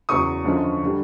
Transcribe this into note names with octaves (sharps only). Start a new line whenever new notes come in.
E2 C#3 F#3 C#6 D#6
F#2 D3 F3 G#3
D3 G3